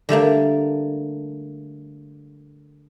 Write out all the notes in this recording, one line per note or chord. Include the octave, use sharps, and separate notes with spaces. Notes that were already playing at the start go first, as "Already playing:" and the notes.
D3 G3 A3 A#3